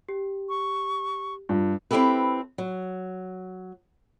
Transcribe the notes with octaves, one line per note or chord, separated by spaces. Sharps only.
G4
C#6
G2 F4
C4 E4 F4 G4 A4 B4
F#3